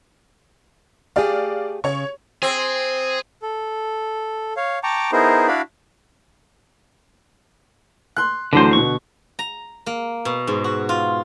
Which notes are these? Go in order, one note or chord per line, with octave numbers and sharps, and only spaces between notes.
A3 G4 G#4 D5 F5
C#3 C#5 C#6
C4 G#4
A4
C#5 F5
G5 A5 A#5 C#6 D6
B3 D#4 E4 G#4 A#4 C5
D4 E4 F#4 D5 F5 B5
C6 F#6
D2 D3 E3 F#3 C5
B2 D3 C#6
A#5
A#3
B2
G#2
F#4
F4